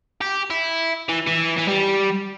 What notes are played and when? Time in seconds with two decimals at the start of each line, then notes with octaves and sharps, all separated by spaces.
0.21 G4
0.51 E4
1.09 E3
1.27 E3
1.58 E3
1.68 G3